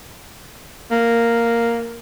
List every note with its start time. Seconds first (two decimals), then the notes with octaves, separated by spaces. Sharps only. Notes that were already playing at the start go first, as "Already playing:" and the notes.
0.91 A#3